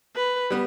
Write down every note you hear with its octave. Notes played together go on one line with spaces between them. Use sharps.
B4
G3 B3